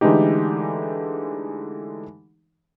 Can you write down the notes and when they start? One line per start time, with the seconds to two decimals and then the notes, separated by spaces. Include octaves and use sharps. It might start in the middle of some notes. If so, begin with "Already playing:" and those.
0.01 D3 E3 G#3 A3 D#4 G4